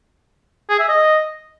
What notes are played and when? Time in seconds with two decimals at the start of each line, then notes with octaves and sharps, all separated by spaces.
0.70 G#4
0.79 E5
0.89 D#5